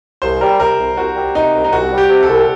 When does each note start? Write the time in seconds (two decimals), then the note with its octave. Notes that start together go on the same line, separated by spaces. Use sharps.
0.22 C2 C5
0.41 G3 A#4
0.60 C3 A#4
0.79 C2
0.97 C2 F#4
1.16 G3
1.35 C3 D#4
1.54 C2
1.64 D#4
1.73 C2 F#4
1.92 G3
1.98 G4
2.09 C3
2.23 A4
2.29 C2